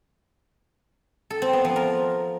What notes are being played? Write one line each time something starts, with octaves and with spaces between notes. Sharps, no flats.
A4
C4
B3
F3
A#4